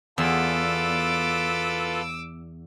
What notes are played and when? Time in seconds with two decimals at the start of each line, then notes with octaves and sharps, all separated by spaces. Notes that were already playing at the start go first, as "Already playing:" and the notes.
0.18 E2 F4 A4 B4 D6 E6